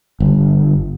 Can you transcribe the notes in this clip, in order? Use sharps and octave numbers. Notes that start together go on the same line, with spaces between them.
G1